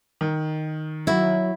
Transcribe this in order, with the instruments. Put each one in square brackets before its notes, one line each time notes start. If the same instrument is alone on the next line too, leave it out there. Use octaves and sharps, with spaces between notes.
[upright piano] D#3
[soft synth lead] F#3 [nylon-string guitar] E4 F#4